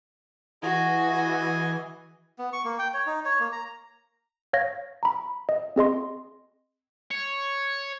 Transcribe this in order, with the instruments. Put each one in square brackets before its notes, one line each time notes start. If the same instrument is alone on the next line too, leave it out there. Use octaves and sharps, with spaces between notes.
[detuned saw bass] E3 [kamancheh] F#4 [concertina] G#4 D#5 G#5
[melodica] B3
C#6
A#3
G5
C#5
D#4
C#5
A#3
A#5
[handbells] C#5 F5 G#6 A#6
A#5 B5
D#5
C4 G#4 D#5 C6
[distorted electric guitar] C#5